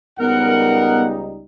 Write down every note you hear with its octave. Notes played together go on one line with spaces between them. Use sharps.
C#2 G3 B3 D#4 A#4 F#5